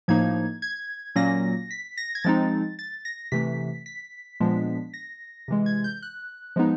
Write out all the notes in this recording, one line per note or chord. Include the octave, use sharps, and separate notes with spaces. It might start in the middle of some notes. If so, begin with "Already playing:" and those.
A2 F3 A#3 D#4 G#6
G#6
A#2 F#3 A#3 C#4 A#6
B6
A#6
G#6
F3 G#3 C4 D#4 A6
A6
A#6
C3 E3 A3 B6
B6
A#2 F3 G#3 B3 D4
A#6
C3 E3 G#3
G#6
G6
F#6
F3 G#3 B3 D#4